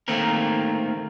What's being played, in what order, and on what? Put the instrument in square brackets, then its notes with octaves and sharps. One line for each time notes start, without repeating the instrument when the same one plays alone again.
[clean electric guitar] D#3 A3 A#3 C4 A#4